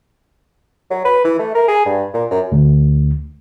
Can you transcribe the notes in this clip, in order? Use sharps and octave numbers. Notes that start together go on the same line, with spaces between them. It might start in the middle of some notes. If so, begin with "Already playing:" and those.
F#3
B4
E3
A3
A#4
G#4
G2
A#2
F#2
D2